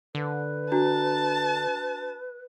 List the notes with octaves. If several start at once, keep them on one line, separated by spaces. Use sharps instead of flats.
D3 B4
D4 F#4 A5 A#5